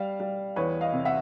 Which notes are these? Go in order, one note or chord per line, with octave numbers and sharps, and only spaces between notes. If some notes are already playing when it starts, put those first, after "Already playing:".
Already playing: G3 F5
G3
E2 B4 C#5
D#5 F5
C3
E5 F#5